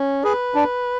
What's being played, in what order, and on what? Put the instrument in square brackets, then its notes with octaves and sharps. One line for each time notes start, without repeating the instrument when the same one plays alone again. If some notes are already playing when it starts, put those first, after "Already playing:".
Already playing: [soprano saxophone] C#4
[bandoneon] G#4 [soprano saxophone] B4
[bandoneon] D4